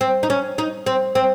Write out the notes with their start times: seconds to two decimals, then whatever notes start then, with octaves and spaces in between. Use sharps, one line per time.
0.01 C4
0.23 D#4
0.30 C#4
0.58 D#4
0.86 C4
1.15 C4